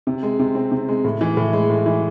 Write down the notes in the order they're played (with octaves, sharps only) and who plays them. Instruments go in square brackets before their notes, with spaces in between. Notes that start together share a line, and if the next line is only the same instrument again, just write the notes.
[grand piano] C3
G#3
C3
C4
C3
G#3
A2
E3
A2
G#3
A2
E3